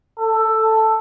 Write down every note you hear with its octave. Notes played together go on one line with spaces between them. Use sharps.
A4